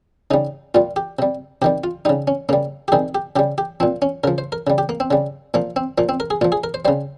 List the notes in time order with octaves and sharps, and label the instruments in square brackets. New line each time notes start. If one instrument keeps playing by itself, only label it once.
[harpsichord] C#3 G3 D#4
A#2 G3 F4
G4
C3 G3
C3 D#3 G3 G4
F4
C#3 G3 D#4
C#4
C#3 G3 A#3
G4
C3 D#3 G3 G#4
G4
C#3 G4
G3
G4
F3 C4
A#2
C#4
C#3 F3 A#4
C5
A#4
C#3 G3
G4
A#3
C4
C#3 G3
A#2 F3 A#3
C4
A#2 F3 A#3
C4
A#4
G#4
A#2 F4
F3
G#4
A#4
C5
G3 C5
C#3